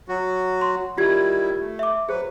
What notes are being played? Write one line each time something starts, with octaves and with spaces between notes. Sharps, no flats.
F#3 F#4
C6
D#3 G3 E4 F4 G4 G#6
A3
E5 D6
F#3 G#4 B4 C5